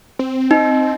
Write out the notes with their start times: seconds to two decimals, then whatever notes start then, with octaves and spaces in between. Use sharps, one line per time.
0.19 C4
0.51 D#4